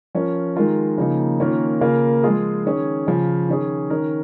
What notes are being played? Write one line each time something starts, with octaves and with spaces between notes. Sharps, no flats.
F3 C#4 A#4
D#3 G#3 F4 A#4
C#3 F3 A#3 D#4
D#3 A#3 C#4 F4 A#4
C#3 A#3 F4 A#4
F3 G#3 F4 G#4
D#3 C#4 G#4
C#3 F3 C#4
D#3 C#4 G#4
D#3 C#4 A#4